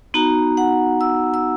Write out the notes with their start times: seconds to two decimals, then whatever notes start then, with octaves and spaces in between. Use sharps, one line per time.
0.14 B3 D#4 F#4 A#5
0.57 F#5
1.01 E6
1.34 E6